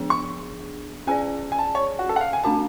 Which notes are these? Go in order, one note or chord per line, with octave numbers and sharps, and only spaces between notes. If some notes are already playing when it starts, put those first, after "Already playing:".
Already playing: F3 B3 D4 G#4
C#6
C#4 G#4 D5 G#5
G#5
A5
C#5
F#4
A4
F#5
F5
G#5
A3 D4 F#4 A5